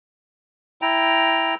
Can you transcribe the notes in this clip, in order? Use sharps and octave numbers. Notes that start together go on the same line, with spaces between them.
E4 G5 A#5